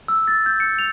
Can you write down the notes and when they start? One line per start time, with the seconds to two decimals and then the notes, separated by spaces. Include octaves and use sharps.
0.08 E6
0.27 A6
0.46 G6
0.60 C#7
0.79 F7